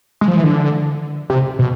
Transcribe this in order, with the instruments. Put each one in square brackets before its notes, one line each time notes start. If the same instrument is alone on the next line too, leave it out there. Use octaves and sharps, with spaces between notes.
[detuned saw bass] G#3
F3
E3
D3
C3
B2